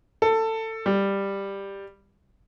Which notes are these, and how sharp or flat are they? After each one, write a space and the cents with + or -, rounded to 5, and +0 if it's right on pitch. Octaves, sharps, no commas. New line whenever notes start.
A4 +20
G3 +10